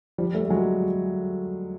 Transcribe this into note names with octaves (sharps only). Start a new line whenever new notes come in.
F3 G3
G3 A3
A3
F#3 G#3